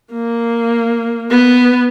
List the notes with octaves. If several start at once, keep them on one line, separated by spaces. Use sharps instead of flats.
A#3
B3